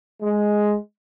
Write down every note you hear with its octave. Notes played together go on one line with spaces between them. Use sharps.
G#3